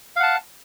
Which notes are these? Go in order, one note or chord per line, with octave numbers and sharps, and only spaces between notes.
F5 F#5 A5